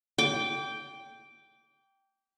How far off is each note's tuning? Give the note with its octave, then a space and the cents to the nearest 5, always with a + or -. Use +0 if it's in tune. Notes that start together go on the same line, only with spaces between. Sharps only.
G5 +0 D6 -30